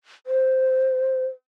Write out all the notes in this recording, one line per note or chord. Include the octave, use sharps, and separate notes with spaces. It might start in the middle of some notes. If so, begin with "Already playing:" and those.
C5